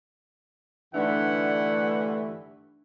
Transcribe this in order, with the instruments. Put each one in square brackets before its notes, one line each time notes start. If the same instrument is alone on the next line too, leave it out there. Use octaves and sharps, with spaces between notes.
[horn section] G2 E3 [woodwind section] D3 A3 [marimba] D4 D#4 [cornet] F#5